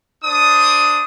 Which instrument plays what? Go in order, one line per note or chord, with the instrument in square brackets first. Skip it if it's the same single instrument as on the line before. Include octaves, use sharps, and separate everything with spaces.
[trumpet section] D4 C5 D#6